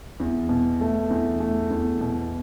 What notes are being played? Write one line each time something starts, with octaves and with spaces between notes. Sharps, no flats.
E2
B2
A3
E2
A3
E2
B2